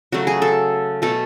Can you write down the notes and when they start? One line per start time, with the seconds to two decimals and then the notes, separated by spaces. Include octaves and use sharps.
0.12 C#3 F#3 A3 F#4
0.27 G#4
0.42 A4
1.02 B2 A3 A4